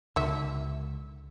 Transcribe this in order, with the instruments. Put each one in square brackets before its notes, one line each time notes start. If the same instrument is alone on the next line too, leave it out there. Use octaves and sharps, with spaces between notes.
[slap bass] C#2 B2 D3 [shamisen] D#3 E5